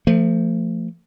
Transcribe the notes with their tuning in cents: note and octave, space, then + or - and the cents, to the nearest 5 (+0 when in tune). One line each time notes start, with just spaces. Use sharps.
F3 -10 A3 +30